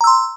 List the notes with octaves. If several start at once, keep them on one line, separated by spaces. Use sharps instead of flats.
A#5 C6 E6